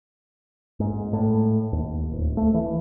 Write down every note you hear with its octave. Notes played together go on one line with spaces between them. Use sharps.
G#2
A2
D#2
D1
A3
E3